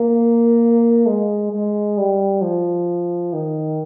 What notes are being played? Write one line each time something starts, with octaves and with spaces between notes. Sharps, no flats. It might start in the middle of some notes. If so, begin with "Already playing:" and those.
Already playing: A#3
G#3
G#3
G3
F3
D#3